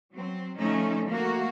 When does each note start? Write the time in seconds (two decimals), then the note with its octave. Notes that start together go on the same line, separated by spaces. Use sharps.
0.13 F#3 C4
0.59 D3 F3 A3 C#4 D#4
1.09 A3 A#3 F#4